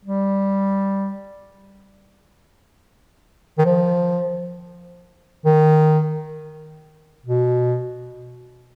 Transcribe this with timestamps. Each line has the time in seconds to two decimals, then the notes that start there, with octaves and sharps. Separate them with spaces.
0.05 G3
3.58 D#3
3.66 F3
5.46 D#3
7.26 B2